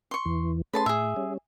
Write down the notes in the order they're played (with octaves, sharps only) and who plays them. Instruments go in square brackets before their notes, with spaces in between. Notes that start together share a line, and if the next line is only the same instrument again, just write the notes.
[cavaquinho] C6 C#6
[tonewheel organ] E2 E3
[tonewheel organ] A3 C#4 G#4 [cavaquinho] B4 A5 C6
[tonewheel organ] A2 [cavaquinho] G#4 E5
[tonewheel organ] G3 C#4